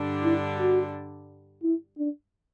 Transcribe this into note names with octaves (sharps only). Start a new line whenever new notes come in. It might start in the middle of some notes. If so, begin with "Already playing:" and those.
Already playing: G2 D3 G3 D4
E4
F#4
E4
D4